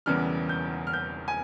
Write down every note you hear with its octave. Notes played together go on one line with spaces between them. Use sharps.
E1 E2 C#3 E3 G3 F6
G6
F6
G6
G#5